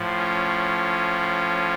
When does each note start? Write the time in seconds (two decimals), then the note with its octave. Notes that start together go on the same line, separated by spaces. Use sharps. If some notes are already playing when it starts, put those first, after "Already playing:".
Already playing: A2 F3
0.16 C#4